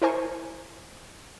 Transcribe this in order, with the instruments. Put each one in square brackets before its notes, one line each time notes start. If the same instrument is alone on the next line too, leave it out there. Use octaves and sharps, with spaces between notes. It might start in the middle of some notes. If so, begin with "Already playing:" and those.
[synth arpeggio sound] E4 A#4 C5 G#5 C#6